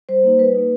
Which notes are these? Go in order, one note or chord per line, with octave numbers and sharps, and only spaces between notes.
G3 C5
A#3 D#4
G3 B4
A#3 D#4